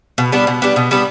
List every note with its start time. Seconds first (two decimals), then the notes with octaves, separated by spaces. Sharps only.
0.18 B2
0.32 G3 B3 D4
0.47 B2
0.62 G3 B3 D4
0.76 B2
0.91 G3 B3 D4